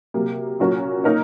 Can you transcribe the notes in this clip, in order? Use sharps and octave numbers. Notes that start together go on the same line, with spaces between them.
C3 F#3 A#3
A#2 F#3 C#4 F#4 A#4
A#3 D#4 A#4 C#5